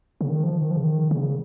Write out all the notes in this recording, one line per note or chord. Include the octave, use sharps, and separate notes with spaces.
C#3
D#3
F3
D#3
F3
C#3
D#3
C#3